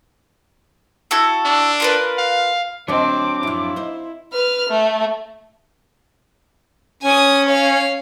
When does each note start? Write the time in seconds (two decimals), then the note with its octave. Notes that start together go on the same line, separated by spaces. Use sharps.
1.11 E4 F#4 A4
1.45 D4
1.80 F4 A#4 B4
2.18 F5
2.88 D2 F#3 C4 D4 D#5 D6
3.43 F#2 F3 E4
3.76 D#4 C5
4.33 B4 F6
4.69 A3
7.03 C#4 G#5 D#6
7.46 C#5 F5